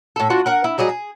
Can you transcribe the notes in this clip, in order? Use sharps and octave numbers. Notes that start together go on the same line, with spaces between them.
A2 A4
D4 F4 F#4
A#4 F#5
E4
F#3 G3 G#4 D#5
G#4